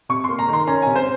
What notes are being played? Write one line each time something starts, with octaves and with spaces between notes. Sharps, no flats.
C3 C#6
A#3 C6
A#5
D#3 C6
C#4 A#5
C3 G#5
C5